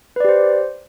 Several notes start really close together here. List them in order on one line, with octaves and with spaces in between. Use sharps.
B4 D5 G4 C5